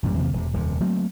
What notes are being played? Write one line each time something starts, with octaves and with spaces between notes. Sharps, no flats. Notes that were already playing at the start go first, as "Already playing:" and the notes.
A1 F#2 A#2 G3
E2 C3 D#3 A#3
E1 C3
D#1 F2 C3
F#3 A3 A#3 C4